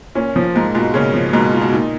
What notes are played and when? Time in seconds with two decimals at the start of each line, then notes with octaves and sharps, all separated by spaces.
0.15 A#2 C#4
0.36 F3
0.55 G#2 A#3
0.75 G#2 B2 F4
0.94 A#2 C#3 C#4
1.14 F3
1.33 G#2 B2 A#3
1.53 F4
1.61 B2
1.72 A#2 D#4